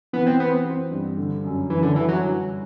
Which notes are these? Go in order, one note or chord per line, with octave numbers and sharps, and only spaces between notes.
E3 B3
C4
B3 C4
C4
G2
D3
F#2
F#2 E3
D3
D3 E3
F#3